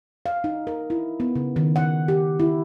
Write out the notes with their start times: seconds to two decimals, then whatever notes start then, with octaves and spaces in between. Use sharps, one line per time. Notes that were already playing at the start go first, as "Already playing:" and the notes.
0.26 F5
0.44 D#4
0.67 A#4
0.90 E4
1.20 B3
1.36 C#3
1.56 D#3
1.76 F#5
2.08 G4
2.40 E4